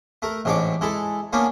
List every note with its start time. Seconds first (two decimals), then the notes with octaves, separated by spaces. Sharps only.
0.22 A3 A#4
0.45 A1 G#2 D4 C#5 C#6 D6
0.81 G#3 E4 A4
1.33 A#3 B3 C#4 D4